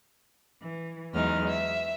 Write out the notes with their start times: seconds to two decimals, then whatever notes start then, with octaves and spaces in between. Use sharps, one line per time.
0.62 E3
1.13 E2 F#3 G#3 D#4 F6
1.48 E5